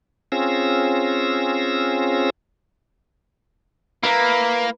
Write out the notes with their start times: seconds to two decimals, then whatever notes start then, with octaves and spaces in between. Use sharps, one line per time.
0.32 C4 C#4 F4 G#4 E6 A#6
4.04 A#3 E4 B4 A#5